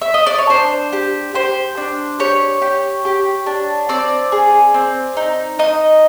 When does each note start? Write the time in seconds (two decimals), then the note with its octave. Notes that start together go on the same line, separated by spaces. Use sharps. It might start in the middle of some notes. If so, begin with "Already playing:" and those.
0.02 E5
0.14 D#5
0.26 D5
0.38 C#5
0.49 D4 C5
0.93 G4
1.34 G4 C5
1.77 D4
2.19 G4 C#5
2.62 G4
3.05 G4
3.46 D4
3.89 C4 D5
4.32 G#4
4.74 C4
5.17 D#4
5.59 D#4 D#5